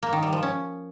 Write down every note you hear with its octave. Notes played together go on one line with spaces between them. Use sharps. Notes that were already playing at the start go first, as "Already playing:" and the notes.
A#3
D#3
G3
F3
C#4